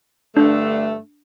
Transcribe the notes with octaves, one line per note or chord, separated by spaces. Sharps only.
G2 D3 A3 D4